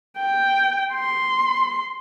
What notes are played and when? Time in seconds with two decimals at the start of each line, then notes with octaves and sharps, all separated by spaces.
0.18 G5
0.94 C6